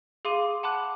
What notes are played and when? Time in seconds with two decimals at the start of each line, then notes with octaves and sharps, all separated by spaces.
0.25 G#4 F5 C6 D6 D#7
0.63 F#5 A5 B5 D6 F#6